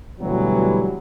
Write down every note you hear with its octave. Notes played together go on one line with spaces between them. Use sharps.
D2 B2 E3 F#3 G3